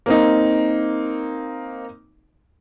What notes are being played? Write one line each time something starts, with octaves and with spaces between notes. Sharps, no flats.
A#3 C4 D#4